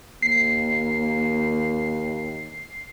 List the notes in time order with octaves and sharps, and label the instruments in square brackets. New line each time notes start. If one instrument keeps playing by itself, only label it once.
[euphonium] D#2 [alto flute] A#3 [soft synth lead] C7